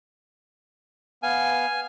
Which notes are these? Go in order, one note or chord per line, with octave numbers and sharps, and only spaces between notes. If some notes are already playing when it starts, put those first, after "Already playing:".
B3 F5 G#5